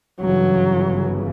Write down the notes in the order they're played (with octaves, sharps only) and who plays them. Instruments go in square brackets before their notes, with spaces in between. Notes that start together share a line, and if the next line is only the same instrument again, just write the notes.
[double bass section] G1 F#2 C#3 E3 [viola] F#3